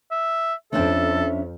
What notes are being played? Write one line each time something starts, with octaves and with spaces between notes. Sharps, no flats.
E5
F2 C#4 D4 A4 C5 E5